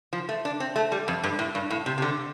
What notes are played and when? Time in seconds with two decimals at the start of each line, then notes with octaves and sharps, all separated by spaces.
0.13 F3
0.29 A3
0.45 D4
0.60 C4
0.76 A3
0.92 G3
1.08 F2
1.23 G2
1.39 A2
1.55 G2
1.70 A2
1.86 C3
1.98 C3
2.02 D3